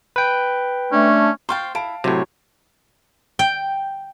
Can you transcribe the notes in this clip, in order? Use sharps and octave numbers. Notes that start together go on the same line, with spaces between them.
B4 G5
A3 C#4 D4
C5 F5 G5 C6 C#6 A6
E4 F5 A5 D7
A2 C3 F#3 C#5
G5